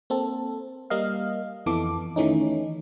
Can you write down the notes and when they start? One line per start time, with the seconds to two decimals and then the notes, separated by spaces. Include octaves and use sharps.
0.10 A#3 C4 A4
0.90 G3 A#3 D#5 F5
1.66 F2 E3 B3 A4 D6
2.16 D#3 E3 A3 C#4 D#4